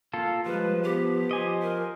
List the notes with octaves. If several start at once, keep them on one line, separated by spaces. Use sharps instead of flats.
A#3 F4 A4
F3 G3 G#3 F4 B4
B3 G4
F3 C5 D#5 G#5
A#4